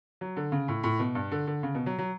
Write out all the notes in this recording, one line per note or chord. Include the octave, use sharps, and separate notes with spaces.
F#3
D3
C#3
A2
A2
B2
G2
D3
D3
C#3
B2
F#3
F#3